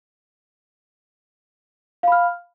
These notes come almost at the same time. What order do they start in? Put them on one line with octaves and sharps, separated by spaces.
F5 B5 F6